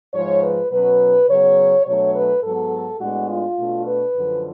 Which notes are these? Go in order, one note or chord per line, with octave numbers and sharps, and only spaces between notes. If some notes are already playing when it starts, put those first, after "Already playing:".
G#2 F3 G#3 C#5
B4
B2 F#3 C#4 B4
C#3 F#3 B3 C#5
B2 F#3 A3 D4 C#5
B4
G#2 F#3 B3 A4
A2 G#3 B3 D4 F#4
F4
B2 A3 D4
B4
F#2 D3 F3